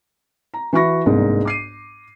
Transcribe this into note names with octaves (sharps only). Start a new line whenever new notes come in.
A#5
E3 F#4 B5 C#6 A#6
G1 C2 G#2 A#3
D6 C7 D#7